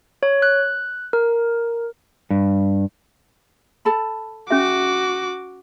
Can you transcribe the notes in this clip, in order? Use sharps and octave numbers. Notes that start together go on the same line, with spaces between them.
C#5
F#6
A#4
G2
A4 A5 B5
C#4 F#4 G#4 E5 D6